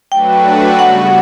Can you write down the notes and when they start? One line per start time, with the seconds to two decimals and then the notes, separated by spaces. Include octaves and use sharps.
0.12 F#3 A3 D4 F#4 B4 G5
0.79 C#3 G3 B3 F#4 F#5